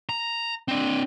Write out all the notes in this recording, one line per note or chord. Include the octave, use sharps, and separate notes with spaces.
A#5
C4 D4